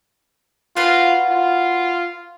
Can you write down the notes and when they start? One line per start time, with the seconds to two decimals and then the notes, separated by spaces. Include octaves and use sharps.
0.76 F4 F#4 B4 F5
1.29 F4